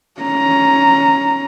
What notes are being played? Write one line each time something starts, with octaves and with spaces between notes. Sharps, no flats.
C#4 A#5